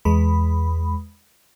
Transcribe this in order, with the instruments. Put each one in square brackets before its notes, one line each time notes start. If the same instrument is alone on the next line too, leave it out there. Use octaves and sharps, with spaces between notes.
[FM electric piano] E2 G#3 B5